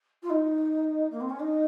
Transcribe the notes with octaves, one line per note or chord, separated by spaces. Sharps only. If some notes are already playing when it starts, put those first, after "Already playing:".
F4
D#4
A#3
C4
C#4
D#4